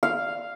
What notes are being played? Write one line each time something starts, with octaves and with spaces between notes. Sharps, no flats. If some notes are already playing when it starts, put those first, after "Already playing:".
F5